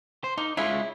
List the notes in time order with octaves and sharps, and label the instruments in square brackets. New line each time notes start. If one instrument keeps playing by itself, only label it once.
[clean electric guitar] C5
[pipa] A#3 [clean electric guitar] D#4
[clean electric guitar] G#3 C#4 F4 [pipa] E4